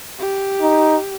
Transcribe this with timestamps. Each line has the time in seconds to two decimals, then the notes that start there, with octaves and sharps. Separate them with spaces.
0.19 G4
0.61 D#4